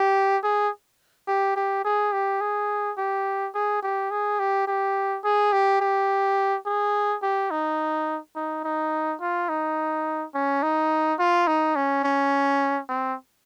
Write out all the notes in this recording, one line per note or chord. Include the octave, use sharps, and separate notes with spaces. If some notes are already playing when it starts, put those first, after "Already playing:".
Already playing: G4
G#4
G4
G4
G#4
G4
G#4
G4
G#4
G4
G#4
G4
G4
G#4
G4
G4
G#4
G4
D#4
D#4
D#4
F4
D#4
C#4
D#4
F4
D#4
C#4
C#4
C4